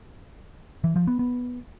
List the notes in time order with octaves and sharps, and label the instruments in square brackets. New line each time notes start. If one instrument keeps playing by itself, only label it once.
[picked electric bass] E3
F3
B3
B3